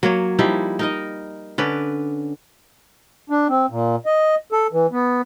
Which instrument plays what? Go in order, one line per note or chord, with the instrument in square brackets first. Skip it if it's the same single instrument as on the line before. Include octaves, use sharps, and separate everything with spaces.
[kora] F#3 A#3 C#5
F3 G3 D#4 E4
D#4 A#4 D#5
D3 C#4 B4 D5
[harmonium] D4
C4
A#2
D#5
A4
E3
B3